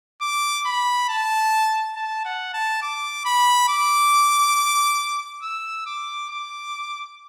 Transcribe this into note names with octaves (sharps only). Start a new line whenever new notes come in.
D6
B5
A5
A5
F#5
A5
D6
B5
D6
E6
D6
D6